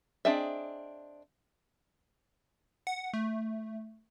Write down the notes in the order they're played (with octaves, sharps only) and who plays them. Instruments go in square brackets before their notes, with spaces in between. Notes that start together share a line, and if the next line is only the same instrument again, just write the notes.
[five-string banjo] C4 D4 G#4 D#5 E5
[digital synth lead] F#5
A3